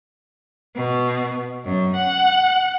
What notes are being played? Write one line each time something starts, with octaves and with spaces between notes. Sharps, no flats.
B2
F#2
F#5